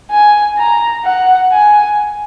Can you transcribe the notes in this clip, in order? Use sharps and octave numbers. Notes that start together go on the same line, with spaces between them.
G#5
A#5
F#5
G#5